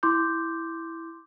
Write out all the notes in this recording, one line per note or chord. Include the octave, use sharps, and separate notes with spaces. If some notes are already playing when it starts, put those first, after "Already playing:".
E4 C6 D6 G6